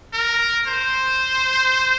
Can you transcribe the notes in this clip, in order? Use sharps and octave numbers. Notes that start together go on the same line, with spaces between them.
A#4
C5